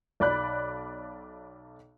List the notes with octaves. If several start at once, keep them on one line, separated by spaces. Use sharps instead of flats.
B1 D5 B5 F#6